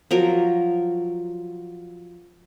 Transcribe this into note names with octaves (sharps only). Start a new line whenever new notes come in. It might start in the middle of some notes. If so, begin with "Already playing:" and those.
F3 F#3 A#4